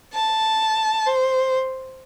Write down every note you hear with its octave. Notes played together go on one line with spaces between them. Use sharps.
A5
C5